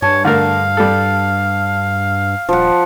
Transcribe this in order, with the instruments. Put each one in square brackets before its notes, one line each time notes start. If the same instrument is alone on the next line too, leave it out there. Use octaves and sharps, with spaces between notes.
[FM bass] G2 [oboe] C#5 [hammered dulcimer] A5
[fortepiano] D3 A3 A#4 [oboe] F5
[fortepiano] G3 A4
[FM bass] D#1 [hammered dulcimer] F3 F#5